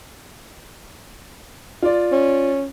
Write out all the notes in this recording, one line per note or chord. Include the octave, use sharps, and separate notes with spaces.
F4 D5
C#4